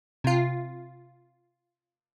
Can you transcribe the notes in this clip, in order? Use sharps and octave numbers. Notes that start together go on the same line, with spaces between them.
C3 F4